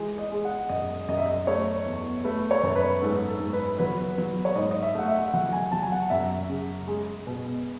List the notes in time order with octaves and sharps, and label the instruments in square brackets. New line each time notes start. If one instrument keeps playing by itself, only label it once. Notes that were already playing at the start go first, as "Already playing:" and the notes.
Already playing: [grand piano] E3 G#3
D#5
G#3
F#5
F#2 D#5
F#2 D#5
E5
D#5
A3 C#5
E2
A3 B4
C#5
F#2
B4
G#2 A4
A4
G#2
B4
F#3 B4
F#3
C#5
G#2 D#5
D#5
E5
A3 F#5
E5
F#3 F#5
G#5
F#3 A5
G#5
F#5
F#2 E5
C#3
G#3
B2